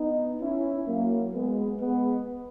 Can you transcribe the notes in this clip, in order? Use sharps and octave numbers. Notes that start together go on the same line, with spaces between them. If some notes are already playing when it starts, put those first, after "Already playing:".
Already playing: B3 D#4
C#4 E4
F#3 A#3
G#3 B3
G#3 B3